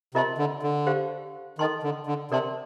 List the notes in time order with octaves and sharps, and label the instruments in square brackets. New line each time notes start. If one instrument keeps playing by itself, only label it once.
[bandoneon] C3 [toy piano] F4 A#4 D#5 A5 C6
[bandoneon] D3
D3
[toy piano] G4 C5 F5
[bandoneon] D#3 [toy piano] A4 D#5 A5 C6
[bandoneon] D3
D3
[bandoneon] C3 [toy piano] A#4 D5 A5 C6